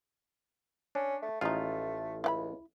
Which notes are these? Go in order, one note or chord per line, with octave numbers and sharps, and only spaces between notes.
C#4 D4
A3
A1 F3 G#3 A3 D#4 F4
C#2 E4 F#5 B5